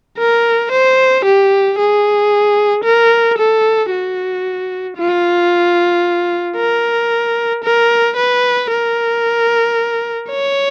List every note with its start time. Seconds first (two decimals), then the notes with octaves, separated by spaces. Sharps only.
0.18 A#4
0.72 C5
1.25 G4
1.79 G#4
2.84 A#4
3.38 A4
3.91 F#4
4.97 F4
6.57 A#4
7.64 A#4
8.17 B4
8.71 A#4
10.30 C#5